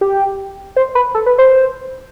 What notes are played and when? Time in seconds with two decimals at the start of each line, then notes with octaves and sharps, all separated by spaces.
0.01 G4
0.76 C5
0.95 B4
1.15 A4
1.26 B4
1.38 C5